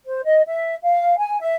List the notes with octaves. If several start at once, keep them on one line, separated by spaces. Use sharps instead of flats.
C5
D#5
E5
F5
G#5
E5